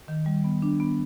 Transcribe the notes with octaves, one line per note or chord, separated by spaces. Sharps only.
D#3
G3
B3
D4
B3